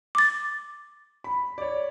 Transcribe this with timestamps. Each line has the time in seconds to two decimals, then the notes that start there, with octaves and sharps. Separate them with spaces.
0.15 D6 A6
1.24 B5
1.58 C#5 D5